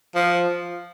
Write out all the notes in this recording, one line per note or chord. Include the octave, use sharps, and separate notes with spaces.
F3